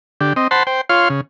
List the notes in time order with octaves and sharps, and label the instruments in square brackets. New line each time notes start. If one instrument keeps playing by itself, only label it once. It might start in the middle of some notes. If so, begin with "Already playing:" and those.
[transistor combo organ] D3 G4
C4 D#5
C5 F#5 A5 B5 C6
C5 G5
F4 C#5 F5 C6
C#3